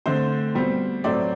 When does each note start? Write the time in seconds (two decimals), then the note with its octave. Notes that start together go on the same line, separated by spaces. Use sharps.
0.06 D3 A3 C4 C5
0.55 B2 G3 C4
1.04 A2 F#3 A3 C4 D5